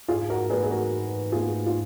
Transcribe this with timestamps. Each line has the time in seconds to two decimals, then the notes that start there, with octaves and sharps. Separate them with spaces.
0.08 G#2 F4 G#4
0.30 F#4 A#4
0.50 G#4 B4
0.63 G#4
0.71 F#4 A#4
1.32 F4 G#4
1.66 F4